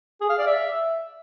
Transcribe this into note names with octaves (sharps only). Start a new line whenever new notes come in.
G#4
F5
D5
E5